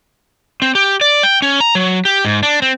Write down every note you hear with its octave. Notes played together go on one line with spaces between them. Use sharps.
C4
G4
D5
G5
C#4
A#5
F#3
G4
G#2
D4
C4